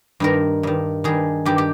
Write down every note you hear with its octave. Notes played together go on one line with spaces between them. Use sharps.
G2 D#3 A#4
G2 D#3
G2 D#3 G#4
G2 D#3 G4
G4